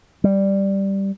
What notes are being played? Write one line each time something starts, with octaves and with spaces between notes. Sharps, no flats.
G3